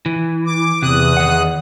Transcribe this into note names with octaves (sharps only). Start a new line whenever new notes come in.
E3
D6
E2 C3 D#6 F#6
D#3 F#5